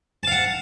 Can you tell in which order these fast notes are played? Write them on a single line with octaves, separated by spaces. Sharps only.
A5 F5 F#5